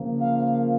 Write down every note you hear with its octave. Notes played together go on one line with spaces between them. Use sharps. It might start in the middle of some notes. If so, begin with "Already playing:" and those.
Already playing: C#3 F3 A#3
F5